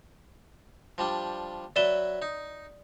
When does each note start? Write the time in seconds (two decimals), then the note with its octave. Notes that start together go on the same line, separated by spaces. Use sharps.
0.98 F3 G3 D4
1.76 F#3 B4 D5 E5 E7 G7
2.22 D#4